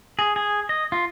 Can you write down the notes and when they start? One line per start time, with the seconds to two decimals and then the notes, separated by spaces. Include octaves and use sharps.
0.19 G#4
0.36 G#4
0.69 D#5
0.92 F4